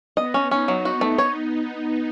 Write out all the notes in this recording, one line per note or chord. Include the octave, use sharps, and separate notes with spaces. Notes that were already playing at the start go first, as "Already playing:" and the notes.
B3 D#5
C#4
B3 C#4 D#4
F#3
F#4
A3
C#5